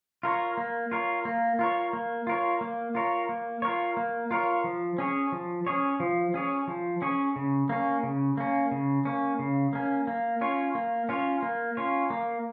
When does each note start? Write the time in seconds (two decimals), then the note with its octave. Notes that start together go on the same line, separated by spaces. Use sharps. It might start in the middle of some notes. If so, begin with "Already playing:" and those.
0.23 F4 A#4 C#5
0.57 A#3
0.92 F4 A#4 C#5
1.25 A#3
1.59 F4 A#4 C#5
1.93 A#3
2.27 F4 A#4 C#5
2.61 A#3
2.95 F4 A#4 C#5
3.29 A#3
3.62 F4 A#4 C#5
3.97 A#3
4.31 F4 A#4 C#5
4.64 F3
4.98 C#4 G#4 C#5
5.32 F3
5.67 C#4 G#4 C#5
6.00 F3
6.34 C#4 G#4 C#5
6.68 F3
7.02 C#4 G#4 C#5
7.36 C#3
7.69 A#3 C#4
8.03 C#3
8.38 A#3 C#4
8.72 C#3
9.05 A#3 C#4
9.39 C#3
9.73 A#3 C#4
10.07 A#3
10.41 C#4 F4 C#5
10.75 A#3
11.09 C#4 F4 C#5
11.43 A#3
11.77 C#4 F4 C#5
12.10 A#3